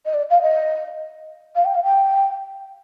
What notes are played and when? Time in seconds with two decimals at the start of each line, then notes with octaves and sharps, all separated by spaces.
0.06 D#5
0.14 D5
0.30 F5
0.42 D#5
1.56 F5
1.65 G5
1.75 F5
1.84 G5